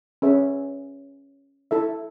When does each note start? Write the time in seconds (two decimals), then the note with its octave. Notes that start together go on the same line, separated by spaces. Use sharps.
0.22 C#4 G#4 B4 E5
1.71 E4 A4 E5